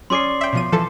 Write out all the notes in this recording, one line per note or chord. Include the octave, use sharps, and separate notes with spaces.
C#4 G#4 D5 C6 D6 C7
E5 G5
B2 F3 D#7
E3 F3 A4 A5